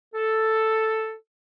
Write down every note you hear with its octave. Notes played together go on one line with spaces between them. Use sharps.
A4